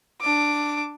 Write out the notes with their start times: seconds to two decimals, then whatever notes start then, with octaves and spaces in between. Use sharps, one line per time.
0.22 D4 D6